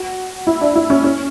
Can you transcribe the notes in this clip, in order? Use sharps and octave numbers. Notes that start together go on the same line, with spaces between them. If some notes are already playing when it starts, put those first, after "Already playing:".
Already playing: F#4
E4
D4
E4
C#4
C#4